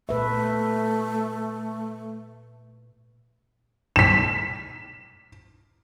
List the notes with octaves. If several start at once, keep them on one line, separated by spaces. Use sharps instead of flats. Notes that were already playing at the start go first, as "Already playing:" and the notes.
A#2 A3 B4 E5
B6 E7